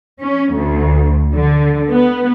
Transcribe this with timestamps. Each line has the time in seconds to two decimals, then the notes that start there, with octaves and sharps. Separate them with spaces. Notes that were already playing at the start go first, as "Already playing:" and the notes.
0.20 C#4
0.54 D2
1.34 D3
1.92 B3